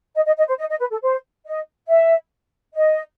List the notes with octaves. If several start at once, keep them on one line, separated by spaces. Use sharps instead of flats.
D#5
D#5
D#5
C5
D#5
D#5
B4
A4
C5
D#5
E5
D#5